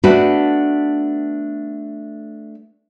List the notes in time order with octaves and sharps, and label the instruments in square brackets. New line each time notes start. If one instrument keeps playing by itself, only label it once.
[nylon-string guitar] A3 B3 D4 F#4 B4